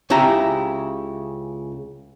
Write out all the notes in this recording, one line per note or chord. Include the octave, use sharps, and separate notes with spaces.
C#2 C#3 E4 G4 A#5